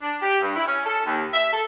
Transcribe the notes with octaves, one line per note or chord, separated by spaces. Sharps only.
D4
G4
G2
E4
C#4
A4
D#2
E5
A4